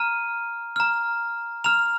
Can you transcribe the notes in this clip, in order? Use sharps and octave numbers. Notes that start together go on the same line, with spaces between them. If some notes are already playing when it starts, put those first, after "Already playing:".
Already playing: A#5 F6 D#7
A#5 F6
A#5 F6 F7